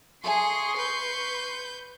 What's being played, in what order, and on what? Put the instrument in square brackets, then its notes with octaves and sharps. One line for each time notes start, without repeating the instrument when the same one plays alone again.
[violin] G#4 [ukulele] A4 E5 G#5 [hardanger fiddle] C6 C#6
[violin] B4 G6